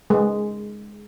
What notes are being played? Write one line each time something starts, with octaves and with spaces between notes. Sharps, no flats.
G#3